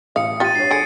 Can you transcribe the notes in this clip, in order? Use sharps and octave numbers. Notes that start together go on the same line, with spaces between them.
A1 F5 D#6 C#7
F4 G4 A6 D#7
G2 C#5 C7
D3 G#4 C#7 D7